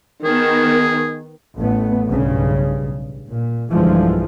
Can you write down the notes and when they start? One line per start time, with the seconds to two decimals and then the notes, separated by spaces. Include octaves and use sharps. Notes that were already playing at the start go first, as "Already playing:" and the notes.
0.25 D#3 B3 G#4
1.57 A1 A3 B3
2.08 B1 G2 C#3
3.30 A#2
3.70 B1 G2 D3 E3 F3 G#3